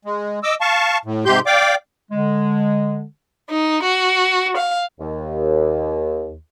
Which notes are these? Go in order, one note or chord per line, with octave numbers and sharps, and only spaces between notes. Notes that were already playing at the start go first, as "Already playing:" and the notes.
G#3
D#5 D6 E6
F5 A5 C#6
A2
G#2 C3 G4 C6 G6
D5 F5 G5 D6
D3 G#3
D#4
F#4
F5
D#2